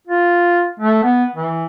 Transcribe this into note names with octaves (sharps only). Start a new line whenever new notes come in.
F4
A3
B3
E3